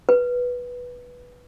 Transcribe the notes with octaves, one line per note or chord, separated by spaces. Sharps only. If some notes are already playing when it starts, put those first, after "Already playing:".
B4